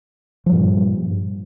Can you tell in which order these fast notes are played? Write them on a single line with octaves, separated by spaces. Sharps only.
F3 G3 G2 A#2